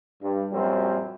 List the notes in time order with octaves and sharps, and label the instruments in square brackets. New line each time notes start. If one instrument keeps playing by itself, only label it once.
[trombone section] G2
A#1 F#2 F#3 G3 C4